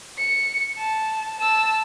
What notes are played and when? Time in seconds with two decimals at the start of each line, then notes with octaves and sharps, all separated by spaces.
0.18 C#7
0.78 A5
1.39 A5 E6